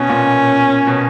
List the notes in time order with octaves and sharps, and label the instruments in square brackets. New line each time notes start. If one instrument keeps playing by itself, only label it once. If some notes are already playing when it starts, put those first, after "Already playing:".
Already playing: [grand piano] B2 [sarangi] C#4
[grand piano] A#2
B2